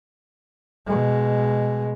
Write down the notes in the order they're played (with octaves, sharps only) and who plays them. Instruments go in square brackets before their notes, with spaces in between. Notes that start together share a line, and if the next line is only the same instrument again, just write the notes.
[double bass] B2 G#3